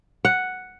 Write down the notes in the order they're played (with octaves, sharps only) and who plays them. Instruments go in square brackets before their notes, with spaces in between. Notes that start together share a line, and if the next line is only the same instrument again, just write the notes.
[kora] F#5